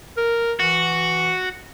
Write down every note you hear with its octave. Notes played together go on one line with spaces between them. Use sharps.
A#4
E3 F#4